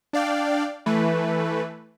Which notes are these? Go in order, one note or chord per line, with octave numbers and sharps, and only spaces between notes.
D4 D5 F5 G5
E3 A3 B4